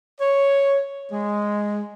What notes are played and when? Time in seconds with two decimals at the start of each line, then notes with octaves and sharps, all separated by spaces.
0.20 C#5
1.11 G#3